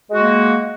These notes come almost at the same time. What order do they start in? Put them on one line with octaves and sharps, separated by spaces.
G#3 F#4 A#3